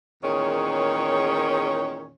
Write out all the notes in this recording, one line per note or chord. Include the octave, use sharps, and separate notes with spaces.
E2 A#2 D#3 C#4 G#4 C#5